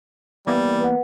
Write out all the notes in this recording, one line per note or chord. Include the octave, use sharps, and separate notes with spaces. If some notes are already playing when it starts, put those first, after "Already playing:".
E3 G3 A#3 B3
B4 F#5